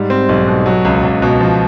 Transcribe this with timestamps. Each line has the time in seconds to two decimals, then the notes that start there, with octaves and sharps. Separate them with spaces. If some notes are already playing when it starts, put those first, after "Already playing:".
Already playing: G#2 G3
0.10 C4
0.29 B1
0.47 B2
0.66 F#3
0.85 C#2
1.03 C#2
1.22 B2
1.41 F3